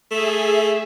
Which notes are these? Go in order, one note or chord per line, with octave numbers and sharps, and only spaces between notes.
A3 G#4 E5